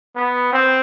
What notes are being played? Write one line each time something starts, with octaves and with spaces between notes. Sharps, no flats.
B3
C4